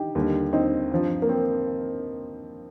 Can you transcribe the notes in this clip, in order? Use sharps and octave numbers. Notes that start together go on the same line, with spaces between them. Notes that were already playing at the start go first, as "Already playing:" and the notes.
Already playing: D#4 G4
D#2 D3 G3
C4 D#4
G2 F3
A#3
C4